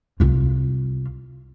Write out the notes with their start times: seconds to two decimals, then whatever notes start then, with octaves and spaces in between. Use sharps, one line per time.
0.20 C2 F4